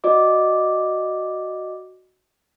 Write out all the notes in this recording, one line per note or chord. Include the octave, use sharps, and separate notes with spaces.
F#4 D5 D#5 D6